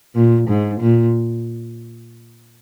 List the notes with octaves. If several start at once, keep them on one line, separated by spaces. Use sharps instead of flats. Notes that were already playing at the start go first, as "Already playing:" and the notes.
A#2
G#2
A#2